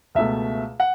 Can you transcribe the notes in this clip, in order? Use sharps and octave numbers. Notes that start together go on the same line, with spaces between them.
C#2 B2 A3 E5
F#5